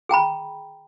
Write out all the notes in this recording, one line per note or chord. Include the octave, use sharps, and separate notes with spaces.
G#4 G5 A#5 B5